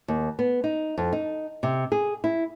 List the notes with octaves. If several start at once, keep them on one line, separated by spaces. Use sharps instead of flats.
D#2
B3
D#4
F2
D#4
C3
G#4
E4